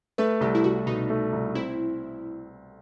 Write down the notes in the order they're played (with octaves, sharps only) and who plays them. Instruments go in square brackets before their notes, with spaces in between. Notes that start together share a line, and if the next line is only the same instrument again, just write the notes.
[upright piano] A3 [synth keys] B4
[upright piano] C2 [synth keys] G4
[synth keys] E4
[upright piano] C2 [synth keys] F#4
[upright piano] B2 [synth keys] D#4
[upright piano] A3
C2
[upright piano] C4 [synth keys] E4